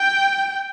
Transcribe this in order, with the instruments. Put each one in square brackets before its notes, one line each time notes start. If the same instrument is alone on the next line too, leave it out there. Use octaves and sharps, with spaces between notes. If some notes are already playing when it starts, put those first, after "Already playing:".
Already playing: [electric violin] G5